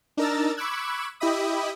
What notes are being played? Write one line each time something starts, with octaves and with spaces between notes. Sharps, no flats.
D4 D#4 A#4 A#5 E6 A6
B5 C#6 D6 E6 F#6 G#6
E4 G4 D#5 E5 B5 D#6